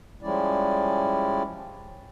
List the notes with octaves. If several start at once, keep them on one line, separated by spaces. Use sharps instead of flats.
F3 G3 G#3 C#4 E4 D5